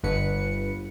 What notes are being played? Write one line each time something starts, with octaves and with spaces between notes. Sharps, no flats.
G1 B4 C#7